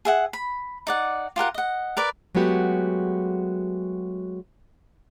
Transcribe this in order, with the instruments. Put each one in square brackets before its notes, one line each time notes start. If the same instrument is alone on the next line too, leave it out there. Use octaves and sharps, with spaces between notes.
[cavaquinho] G#4 E5 F#5
B5
D#4 D5 F#5
F4 G4 A#4 F#5
D#5 F#5
A#4 B4 D5
[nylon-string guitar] F#3 G#3 A3 B3 F#4 G4